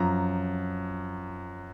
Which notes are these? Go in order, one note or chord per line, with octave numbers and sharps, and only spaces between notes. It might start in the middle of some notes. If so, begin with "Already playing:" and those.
Already playing: F#2 F3 A#5